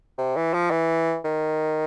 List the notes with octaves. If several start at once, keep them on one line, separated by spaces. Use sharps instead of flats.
C3
E3
F3
E3
D#3